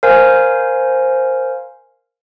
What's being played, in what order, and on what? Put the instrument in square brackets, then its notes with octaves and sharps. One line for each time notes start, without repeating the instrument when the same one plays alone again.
[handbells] A#4 C5 F5 G#5